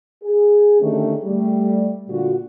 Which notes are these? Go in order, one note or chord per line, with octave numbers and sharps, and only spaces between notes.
G#4
D3 D#3 A3 C#4 D#4 G4
G3 A3
A#2 D3 F4 F#4